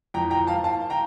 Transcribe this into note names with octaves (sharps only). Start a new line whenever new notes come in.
F2 E3 G5 A#5
G5 A#5
F5 A5
F5 A5
G5 A#5